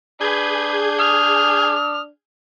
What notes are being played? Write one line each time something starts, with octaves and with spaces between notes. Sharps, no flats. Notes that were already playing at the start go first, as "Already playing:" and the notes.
D4 G#4 B4 G6 G#6
D#6 F6